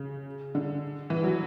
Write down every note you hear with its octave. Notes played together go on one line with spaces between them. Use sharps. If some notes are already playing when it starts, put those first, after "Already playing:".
Already playing: C#3
D3
E3
F#3